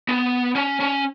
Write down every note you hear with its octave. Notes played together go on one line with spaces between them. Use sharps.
B3
C#4
C#4